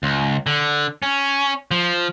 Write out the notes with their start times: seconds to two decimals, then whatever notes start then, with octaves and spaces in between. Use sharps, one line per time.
0.03 C#2
0.47 D3
1.03 C#4
1.71 F3